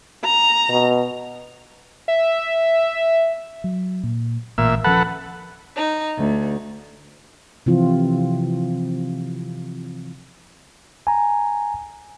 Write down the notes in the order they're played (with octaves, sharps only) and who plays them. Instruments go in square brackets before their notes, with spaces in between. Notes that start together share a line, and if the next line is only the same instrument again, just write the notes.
[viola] A#5
[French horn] B2
[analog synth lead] E5
[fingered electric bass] F#3
A#2
[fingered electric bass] A1 [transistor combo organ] A#2 E5
[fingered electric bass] D#1 F3 C#4 [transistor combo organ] A4 B4 F#5
[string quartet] D#4
D2
[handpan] C3 E3 F3 C4 E4 F4
[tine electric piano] G#5 A#5